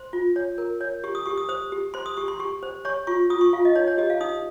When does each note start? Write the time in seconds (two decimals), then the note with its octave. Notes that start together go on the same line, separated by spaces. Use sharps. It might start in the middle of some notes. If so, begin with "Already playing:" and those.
Already playing: C5 C6
0.13 F4
0.36 C#5
0.58 A#4
0.81 C#5
1.04 G4 C#6
1.15 D#6
1.26 G4 C#6
1.37 D#6
1.49 C5 D#6
1.72 G4
1.94 C5 C6
2.06 D#6
2.17 G4 C#6
2.28 C6
2.39 G4 C#6
2.63 C5
2.85 C#5 C#6
3.07 F4 C#6
3.30 F4 D#6
3.41 C#6
3.53 F4 F5
3.65 D#5
3.75 D#4 C#5
3.88 C#5
3.98 G4 D#5
4.10 F5
4.20 D#4 D#6